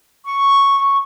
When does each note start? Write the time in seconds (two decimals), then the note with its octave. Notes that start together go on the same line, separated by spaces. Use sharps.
0.25 C#6